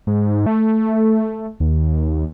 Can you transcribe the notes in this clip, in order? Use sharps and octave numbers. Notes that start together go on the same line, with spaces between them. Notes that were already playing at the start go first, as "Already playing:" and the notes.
G#2
A3
D#2